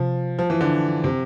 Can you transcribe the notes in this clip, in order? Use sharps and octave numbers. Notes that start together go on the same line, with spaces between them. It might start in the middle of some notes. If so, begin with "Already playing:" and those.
Already playing: C3 F3
F3
E3
D3
C3